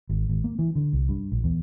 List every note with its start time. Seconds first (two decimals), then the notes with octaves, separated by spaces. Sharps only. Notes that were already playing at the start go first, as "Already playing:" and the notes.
0.09 G#1
0.29 G#1
0.44 A#3
0.59 E3
0.75 D3
0.93 C2
1.09 G2
1.32 A#1
1.44 E2